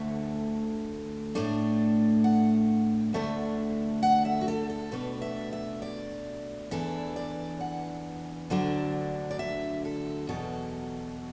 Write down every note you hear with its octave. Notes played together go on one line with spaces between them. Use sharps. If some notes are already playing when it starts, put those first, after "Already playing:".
Already playing: D2 D3 A3 E5
A2 A3 D4
F#5
D2 D3 A3 D4 E5
F#5
E5
F#4
A4
A4
B2 A3 D4 B4
E5
E5
D5
E2 E3 D4 A4
D5
F#5
D2 D3 F#3 D4
D5
E5
A4
E2 B2 F#3 A4